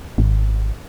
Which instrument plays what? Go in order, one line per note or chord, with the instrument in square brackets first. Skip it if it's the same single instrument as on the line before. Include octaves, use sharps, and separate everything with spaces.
[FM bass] G#1